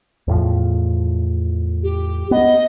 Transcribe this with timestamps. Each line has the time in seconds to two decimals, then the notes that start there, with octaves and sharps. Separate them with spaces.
0.28 E2 A2 F3
1.83 G4
2.31 B3 D#5